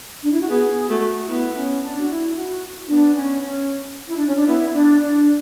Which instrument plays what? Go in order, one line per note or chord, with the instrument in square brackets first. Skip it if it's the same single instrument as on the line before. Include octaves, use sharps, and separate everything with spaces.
[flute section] D4
E4
F#4
[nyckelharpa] B3 [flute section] G#4
[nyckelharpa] A3 [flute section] F#4
[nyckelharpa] B3 [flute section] E4
[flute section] C#4
D4
F#4
E4
F#4
[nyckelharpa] B3 [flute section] D4
[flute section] C#4
C#4
E4
D4
C#4
D4
[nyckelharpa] B3 [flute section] E4
[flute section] D4
D4